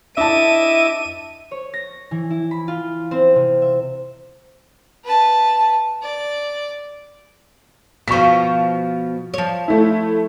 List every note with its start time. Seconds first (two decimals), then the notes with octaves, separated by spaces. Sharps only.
0.17 D4 E4 D#5 E5 A5 D6 D#7
1.51 C#5
1.74 A#6
2.11 E3
2.30 E4
2.51 B5
2.68 F4
3.11 C4
3.36 C3
3.62 E5
5.04 B4 A5
6.02 D5
8.08 B2 F3 C#6 B6
9.34 F3 C#5
9.68 A3 E4